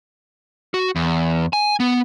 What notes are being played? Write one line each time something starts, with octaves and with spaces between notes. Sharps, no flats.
F#4
E2
G#5
B3